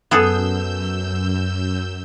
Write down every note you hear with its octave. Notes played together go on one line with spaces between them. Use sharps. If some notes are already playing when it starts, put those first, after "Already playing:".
F#2 B3 G#4 A4 E6 G6